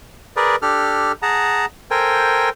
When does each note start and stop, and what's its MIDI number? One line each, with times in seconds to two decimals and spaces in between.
0.37 0.56 68
0.37 0.56 70
0.37 0.56 71
0.37 0.56 74
0.62 1.12 62
0.62 1.12 67
0.62 1.12 69
0.62 1.12 89
1.22 1.65 68
1.22 1.65 78
1.22 1.65 81
1.22 1.65 82
1.91 2.49 69
1.91 2.49 70
1.91 2.49 72
1.91 2.49 79
1.91 2.49 80